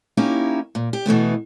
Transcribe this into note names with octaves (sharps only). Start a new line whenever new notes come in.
A#3 C#4 D#4 E4 G4
A#2
G4
B2 E3 A3 B3